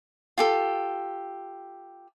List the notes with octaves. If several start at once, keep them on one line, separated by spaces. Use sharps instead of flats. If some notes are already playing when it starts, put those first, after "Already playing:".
F4 G4 A4